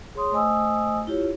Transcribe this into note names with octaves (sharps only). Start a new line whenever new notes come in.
G#4 C#5 C6 D#6
A3 C5 D#5 G#5 D#6 E6
E4 F4 G4 C#5